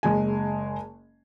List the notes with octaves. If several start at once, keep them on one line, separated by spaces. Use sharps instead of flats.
F#1 G#3 G#5